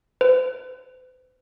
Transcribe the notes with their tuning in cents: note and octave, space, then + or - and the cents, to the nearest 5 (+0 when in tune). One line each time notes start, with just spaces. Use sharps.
C5 -45